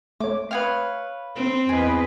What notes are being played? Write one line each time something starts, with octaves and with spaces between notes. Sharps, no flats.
A3 C#5 D6
B4 C#5 E5 F5 G5 D#6
C4
E2 G#4 B4 D#5